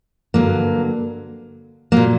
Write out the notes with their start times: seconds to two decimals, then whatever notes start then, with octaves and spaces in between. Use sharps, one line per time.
0.34 G2 D3 F#3 A#3
1.92 A#2 F#3 A#3